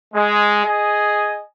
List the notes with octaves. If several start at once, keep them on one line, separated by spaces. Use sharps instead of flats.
G#3
G#4 D#5 G#5